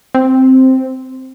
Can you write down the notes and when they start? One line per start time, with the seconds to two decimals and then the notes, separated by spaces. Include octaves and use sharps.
0.15 C4